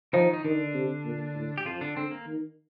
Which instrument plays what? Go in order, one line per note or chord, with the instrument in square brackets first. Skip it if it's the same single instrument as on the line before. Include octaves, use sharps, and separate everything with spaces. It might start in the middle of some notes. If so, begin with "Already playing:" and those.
[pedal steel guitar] D#3 D#4 [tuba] F3
[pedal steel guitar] D#4
[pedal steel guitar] D3 D4 [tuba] D#3
[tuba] C3
A#2
A2
[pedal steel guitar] G4
[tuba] F2 [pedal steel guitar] F3 F4
[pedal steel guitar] D3 D4
[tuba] D3 [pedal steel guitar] C4
[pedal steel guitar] A#3
[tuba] D#3